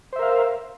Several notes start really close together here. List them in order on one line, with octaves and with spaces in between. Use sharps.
C5 E5 A#4 F5